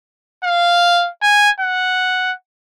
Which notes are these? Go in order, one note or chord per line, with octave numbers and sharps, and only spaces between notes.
F5
G#5
F#5